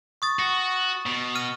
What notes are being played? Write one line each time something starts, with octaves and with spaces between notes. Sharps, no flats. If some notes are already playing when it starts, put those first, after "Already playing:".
C#6 D#6 A6
F#4
B2
F6 D#7